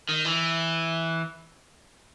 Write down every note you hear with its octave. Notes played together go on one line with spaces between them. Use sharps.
D#3
E3